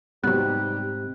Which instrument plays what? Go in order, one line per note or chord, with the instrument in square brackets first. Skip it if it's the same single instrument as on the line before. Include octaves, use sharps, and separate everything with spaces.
[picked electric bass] G#2 C3 [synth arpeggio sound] F#3 B3 [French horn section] G3 D#4 G4 [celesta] F#6